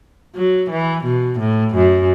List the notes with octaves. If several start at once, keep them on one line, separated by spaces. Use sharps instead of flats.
F#3
E3
B2
A2
F#2